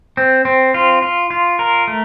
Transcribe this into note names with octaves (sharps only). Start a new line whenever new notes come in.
C4
C4
F4
F4
F4
A#4
A3